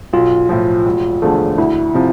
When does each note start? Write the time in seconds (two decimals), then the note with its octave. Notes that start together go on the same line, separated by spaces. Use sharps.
0.13 B1 F4
0.49 A2 F3
0.86 E1
1.22 E2 D3 F3 A3
1.58 D2 E4
1.94 C3 F3